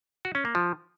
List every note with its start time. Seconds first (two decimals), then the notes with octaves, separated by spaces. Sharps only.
0.25 F#4
0.35 C#4
0.45 A#3
0.55 F3